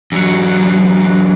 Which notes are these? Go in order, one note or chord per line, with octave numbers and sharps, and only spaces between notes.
E2 F#3